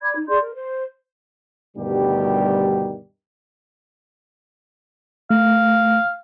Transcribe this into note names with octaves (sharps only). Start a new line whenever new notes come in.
D5 B5 D6 G#6
D#4
G#4 D5 C6 G6
A#4
C5
D2 G2 B2 D#3 G3 G4
A3 F5